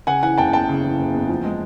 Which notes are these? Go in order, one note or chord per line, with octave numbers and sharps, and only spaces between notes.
C#3 F#5 G#5
E3 F#5 G#5
F#1 G5 A5
E2 G5 A5
C#3
E3
F#1
E2
F3
G#3